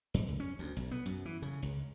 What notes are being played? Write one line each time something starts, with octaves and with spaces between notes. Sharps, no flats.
F2
C#2
C#4
D2
B1
B3
F#2
E3
C#3
C#2